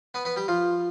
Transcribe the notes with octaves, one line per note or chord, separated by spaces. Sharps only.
B3 B4
B3 B4
G3 G4
F3 F4